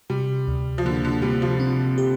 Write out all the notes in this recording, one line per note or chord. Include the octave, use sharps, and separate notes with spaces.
C3 G3
D2
F3
D3 A#3
D3
C3 G3
F3
C4
G4